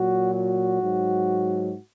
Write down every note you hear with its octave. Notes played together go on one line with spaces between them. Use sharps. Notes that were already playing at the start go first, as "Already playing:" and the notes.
Already playing: A#2 F#3 F#4
F#4
G#2 F#3